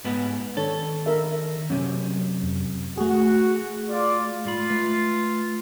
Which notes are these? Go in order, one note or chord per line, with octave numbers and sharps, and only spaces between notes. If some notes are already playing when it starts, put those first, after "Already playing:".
G#2 B3
D#3 D4 A4 C#5
D4 A#4 E5
F#2 C3 F#3 C#4
F2
A3 F#4 G#4
F4 D5
G#2 A3 F4 B5
A3 B4 E5